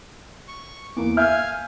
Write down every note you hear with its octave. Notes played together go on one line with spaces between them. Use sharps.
C#6
E2 A#3 D6
E5 F5 G#5 F6 G6